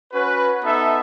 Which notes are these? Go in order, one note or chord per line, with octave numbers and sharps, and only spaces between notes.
C#4 F#4 B4
B3 D#4 A4 E5